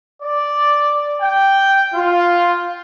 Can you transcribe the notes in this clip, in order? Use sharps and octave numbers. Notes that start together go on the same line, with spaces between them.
D5
G5
F4